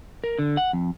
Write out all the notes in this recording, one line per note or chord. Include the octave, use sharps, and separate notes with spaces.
A#4
D3
F#5
F2